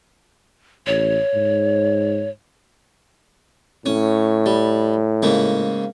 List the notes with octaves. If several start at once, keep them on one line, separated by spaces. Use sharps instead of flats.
A1 C#5
G#2
A2 C#4
G3
G#2 C#3 A#3